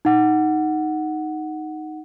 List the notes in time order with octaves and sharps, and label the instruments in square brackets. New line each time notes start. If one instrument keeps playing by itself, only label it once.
[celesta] D#4 F#5